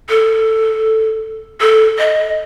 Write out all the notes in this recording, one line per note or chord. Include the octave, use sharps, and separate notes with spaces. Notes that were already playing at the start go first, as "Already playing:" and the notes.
A4
A4
D#5